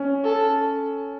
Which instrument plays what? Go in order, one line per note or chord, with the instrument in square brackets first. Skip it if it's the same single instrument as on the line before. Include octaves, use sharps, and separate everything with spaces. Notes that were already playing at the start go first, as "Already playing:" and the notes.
Already playing: [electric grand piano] C#4
[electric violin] A4